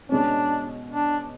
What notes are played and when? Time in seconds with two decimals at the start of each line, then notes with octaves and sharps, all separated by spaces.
0.09 B2 G#3 C#4 D4
0.89 D4